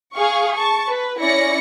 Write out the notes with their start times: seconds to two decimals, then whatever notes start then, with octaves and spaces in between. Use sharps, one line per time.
0.14 G#4 F5 C#6
0.54 A5 C#6
0.88 B4
1.20 C#4 E4 D5 A#6 C#7